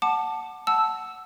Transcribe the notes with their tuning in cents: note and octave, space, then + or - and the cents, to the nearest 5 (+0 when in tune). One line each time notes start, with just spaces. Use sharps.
F#5 +0 A5 +0 D6 +25
F#5 +0 A5 -5 E6 +0